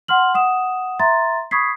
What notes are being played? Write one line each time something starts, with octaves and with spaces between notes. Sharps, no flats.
F#5 C6 F6 F#7
F#5 D#6 E7
E5 A#5 C6 A6
B5 C#6 D#6 G#6 B6 C7